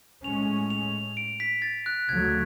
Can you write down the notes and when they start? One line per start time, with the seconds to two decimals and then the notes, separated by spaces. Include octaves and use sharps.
0.24 A2 G#3 C#4 F7
0.70 F7
1.17 D7
1.40 B6
1.62 A6
1.86 F#6
2.09 D2 C#3 F#3 A3 G#6